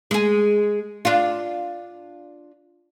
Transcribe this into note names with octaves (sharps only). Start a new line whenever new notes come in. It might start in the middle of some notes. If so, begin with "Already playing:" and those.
G#3 G#4
D4 F4